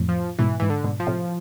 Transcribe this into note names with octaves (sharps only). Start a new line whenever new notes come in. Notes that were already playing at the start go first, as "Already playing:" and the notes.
Already playing: F2 A2
F3
G#2 B2 E3
G#2 E3
D3
G#2 B2
F3
A2 C3